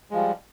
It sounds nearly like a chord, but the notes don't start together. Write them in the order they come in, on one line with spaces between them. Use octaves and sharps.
G#3 F3 G3